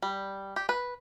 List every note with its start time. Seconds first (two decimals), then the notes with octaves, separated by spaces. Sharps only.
0.02 G3
0.56 G4
0.69 B4